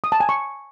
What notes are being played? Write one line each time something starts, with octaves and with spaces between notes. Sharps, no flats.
D#6
A5
G#5
C#6